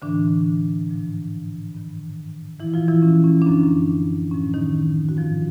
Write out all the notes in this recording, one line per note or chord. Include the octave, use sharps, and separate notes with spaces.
A2 D3 E3 D4
G#2 F3
G2 D#3
A#2 E3 F3 E4
F3 F4
E3 E4
C#4
C#4
D4
F#2 D3 F3 C#4
A2 F3 C#4
D#3 D#4
F#4
G#2 D#3 F3 F4